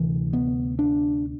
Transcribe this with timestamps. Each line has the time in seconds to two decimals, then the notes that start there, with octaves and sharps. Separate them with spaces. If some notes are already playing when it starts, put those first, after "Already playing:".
Already playing: D2 C3 E3
0.33 B3
0.79 D4